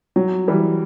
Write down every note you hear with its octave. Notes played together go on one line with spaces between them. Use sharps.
F#3
E3 G3